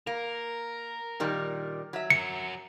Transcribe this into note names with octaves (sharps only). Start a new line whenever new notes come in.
A#3 A#4
A#2 D#3 G3
F#3 E5
F#4 A#4 C#7